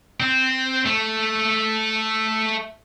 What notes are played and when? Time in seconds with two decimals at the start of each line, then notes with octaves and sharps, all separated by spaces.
0.20 C4
0.86 A3